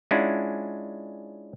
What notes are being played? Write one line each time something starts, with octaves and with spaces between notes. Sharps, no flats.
G#3 C#4 D4 E4 F4 F#5